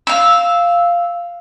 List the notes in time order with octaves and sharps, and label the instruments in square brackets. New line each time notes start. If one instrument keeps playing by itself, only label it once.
[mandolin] F5 E6